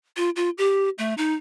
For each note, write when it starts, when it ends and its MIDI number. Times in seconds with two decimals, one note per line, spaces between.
0.17 0.30 65
0.36 0.50 65
0.58 0.89 67
0.98 1.14 57
1.18 1.34 63